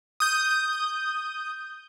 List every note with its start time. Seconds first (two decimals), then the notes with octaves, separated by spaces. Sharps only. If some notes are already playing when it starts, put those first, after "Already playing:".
0.20 D#6 G6